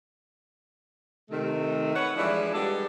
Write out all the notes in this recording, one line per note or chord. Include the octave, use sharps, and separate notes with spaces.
C3 D#3 A3
B4 C#5 F#5
E3 F3 G3 G#3 D4 E4
G3 G#3 B3 D4 G4 A4